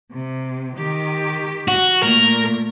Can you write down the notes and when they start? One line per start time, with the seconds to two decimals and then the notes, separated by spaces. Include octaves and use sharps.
0.12 C3
0.77 D#3 G4
1.68 F#4
2.03 A#2 A3 A#4